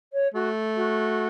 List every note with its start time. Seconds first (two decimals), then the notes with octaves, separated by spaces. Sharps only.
0.13 C#5
0.34 A3 F#4
0.76 F#4